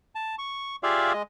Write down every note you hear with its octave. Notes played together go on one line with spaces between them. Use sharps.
A5
C#6
F4 G4 G#4 D5 E5 F5
G#3 D#5